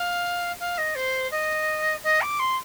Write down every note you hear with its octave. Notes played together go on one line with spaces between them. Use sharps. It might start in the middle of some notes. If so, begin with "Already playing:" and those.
Already playing: F5
F5
D#5
C5
D#5
D#5
D6
C6